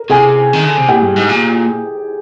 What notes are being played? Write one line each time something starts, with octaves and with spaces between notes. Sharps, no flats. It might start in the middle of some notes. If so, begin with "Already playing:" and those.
Already playing: A#4
C3 G#4 G#5
D#3
D3
C3
A#2 G4 G5
G2
G#2
A#2